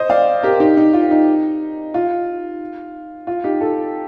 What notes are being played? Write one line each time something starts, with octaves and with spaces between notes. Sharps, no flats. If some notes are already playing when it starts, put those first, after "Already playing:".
Already playing: C5 D#5
D5 F5
G4 A#4
D#4 G4
D#4
F4
D#4
F4
F4
D#4 G4
F4 A4